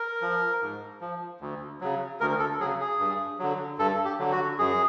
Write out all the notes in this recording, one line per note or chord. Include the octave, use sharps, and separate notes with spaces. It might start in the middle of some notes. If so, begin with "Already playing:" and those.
Already playing: A#4
F3
G#2
F3
D2
C#3 F#3
D2 A#4
A4
C#3 F#3 G#4
G#4
G2
D3 F#3
G2 A4
G4
D3 F#3
F#4
F#2 G#4